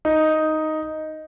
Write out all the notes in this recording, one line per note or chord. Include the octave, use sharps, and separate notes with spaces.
D#4